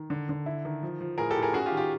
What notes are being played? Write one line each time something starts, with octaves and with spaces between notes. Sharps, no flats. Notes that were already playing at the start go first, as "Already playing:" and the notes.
Already playing: D#3
D3
D3
E4
D#3
F3
F3
A2 G#4 A#4
G4 A4
A2
G#4 A#4
C#4 F#4 G#4
F4 G4
D#3
F4 G4